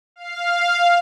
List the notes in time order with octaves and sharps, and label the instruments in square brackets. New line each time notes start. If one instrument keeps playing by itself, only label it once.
[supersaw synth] F5